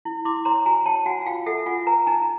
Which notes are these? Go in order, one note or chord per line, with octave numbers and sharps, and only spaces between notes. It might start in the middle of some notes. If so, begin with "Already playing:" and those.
E4
E4 C6 D6
C#5 A#5 C6
F#4 G#5 A#5
C#5 G5 A5
F#4 F#5 G#5
G#5
F4 F5 G5
A4 E5 F#5
F4 F#5 G#5
B4 G#5 A#5
D#4 G#5 A#5